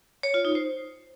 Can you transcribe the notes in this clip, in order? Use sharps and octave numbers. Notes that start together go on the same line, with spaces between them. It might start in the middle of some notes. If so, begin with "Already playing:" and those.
C#5
F4
D#4
C5